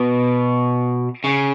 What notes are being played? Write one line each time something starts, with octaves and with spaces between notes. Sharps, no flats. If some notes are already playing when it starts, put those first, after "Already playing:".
Already playing: B2
C#3